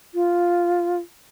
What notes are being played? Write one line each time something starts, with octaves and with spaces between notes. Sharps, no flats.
F4